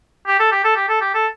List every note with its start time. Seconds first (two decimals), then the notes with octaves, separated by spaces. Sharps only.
0.27 G4
0.40 A4
0.52 G4
0.64 A4
0.76 G4
0.89 A4
1.01 G4
1.14 A4